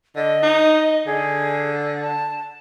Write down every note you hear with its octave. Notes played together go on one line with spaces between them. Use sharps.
D3 D#5
D#4
D3 G#4
A5